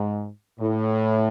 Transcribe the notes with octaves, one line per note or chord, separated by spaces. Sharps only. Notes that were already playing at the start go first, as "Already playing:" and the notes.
Already playing: G#2
A2